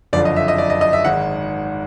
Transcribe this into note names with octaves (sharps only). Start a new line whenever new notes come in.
F#1 F2 D3 F3 D5
D#5
E5
D#5
D5
D#5
D#5
E5
G#1 G#2 D#3 F#5